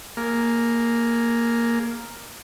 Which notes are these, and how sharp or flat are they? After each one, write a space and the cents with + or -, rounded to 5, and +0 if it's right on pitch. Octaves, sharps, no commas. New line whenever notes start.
A#3 +0 G#4 +20